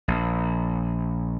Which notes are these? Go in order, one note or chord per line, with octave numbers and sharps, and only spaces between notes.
A#1